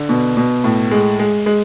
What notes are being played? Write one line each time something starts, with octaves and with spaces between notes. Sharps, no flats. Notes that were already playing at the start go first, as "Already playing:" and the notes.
Already playing: D3
B2
B2
A2
G#3
G#3
G#3